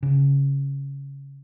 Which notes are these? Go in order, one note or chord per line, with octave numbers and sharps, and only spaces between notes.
C#3